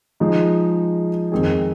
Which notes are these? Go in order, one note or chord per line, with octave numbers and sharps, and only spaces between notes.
F3 G#3 D#4
F2 D#3 G#3 C4 G#4